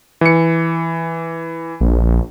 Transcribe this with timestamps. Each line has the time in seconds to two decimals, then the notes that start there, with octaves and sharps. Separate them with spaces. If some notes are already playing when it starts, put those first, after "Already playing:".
0.21 E3 C#7
1.81 A#1